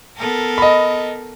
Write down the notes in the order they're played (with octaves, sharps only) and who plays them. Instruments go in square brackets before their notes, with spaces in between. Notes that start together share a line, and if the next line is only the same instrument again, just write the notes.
[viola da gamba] B3 A4 A#4
[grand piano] D#5 B5